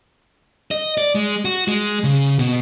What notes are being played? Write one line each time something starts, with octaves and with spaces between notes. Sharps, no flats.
D#5
D5
G#3
F#4
G#3
C#3
B2